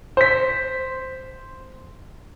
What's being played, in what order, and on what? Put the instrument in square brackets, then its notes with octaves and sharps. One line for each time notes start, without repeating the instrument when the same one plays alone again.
[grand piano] C5 B6